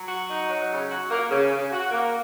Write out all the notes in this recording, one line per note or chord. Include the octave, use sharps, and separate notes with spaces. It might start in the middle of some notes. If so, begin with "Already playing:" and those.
Already playing: F#3
F#4
D#4
F#3
C#3
F#4
A#3
C#3
C#3
F#4
A#3